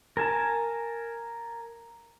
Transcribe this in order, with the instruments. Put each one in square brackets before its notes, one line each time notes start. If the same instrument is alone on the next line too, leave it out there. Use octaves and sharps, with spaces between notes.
[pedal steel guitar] A#4 G#5 A5